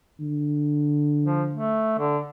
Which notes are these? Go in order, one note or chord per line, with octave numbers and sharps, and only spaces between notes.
D3
F3
A3
D3